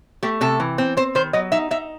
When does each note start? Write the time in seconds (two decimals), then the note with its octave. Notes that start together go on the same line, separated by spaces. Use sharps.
0.23 A3 G4
0.41 C3 A4
0.60 E3
0.78 C4
0.97 C4 C5
1.15 D#3 C5
1.33 F#3 D#5
1.52 D#4 E5
1.71 D#4 E5